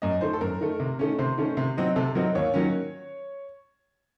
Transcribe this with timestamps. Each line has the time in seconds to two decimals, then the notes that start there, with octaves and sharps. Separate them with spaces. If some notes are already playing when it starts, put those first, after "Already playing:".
0.02 F#2 D#5
0.21 D#3 A3 C5
0.33 A4
0.41 F#2 A#4
0.61 D#3 A3
0.80 C3
0.99 D#3 A3 C#4
1.19 C3 C5
1.38 D#3 A3 C#4
1.57 C3
1.77 F#3 C4 D#4
1.96 C3 A4
2.15 F#3 C4 D#4 A#4
2.35 D#2 C#5
2.54 D#3 F#3 A#3 C#4